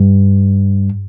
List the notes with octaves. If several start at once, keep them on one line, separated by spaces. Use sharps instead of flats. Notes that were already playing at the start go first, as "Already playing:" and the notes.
Already playing: G2